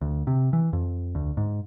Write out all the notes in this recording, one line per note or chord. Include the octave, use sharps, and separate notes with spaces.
D2
C3
E3
F2
D2
G#2